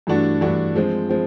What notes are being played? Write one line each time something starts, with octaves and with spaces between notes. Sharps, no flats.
G2 E3 A3 D4 F#4
G2 E3 A3 D4 F#4
F3 G#3 C4
F3 G#3 C4